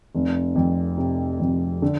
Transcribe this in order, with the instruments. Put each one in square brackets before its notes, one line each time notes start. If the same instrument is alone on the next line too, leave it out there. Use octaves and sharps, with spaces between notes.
[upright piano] F1
F2
C3
F2
D3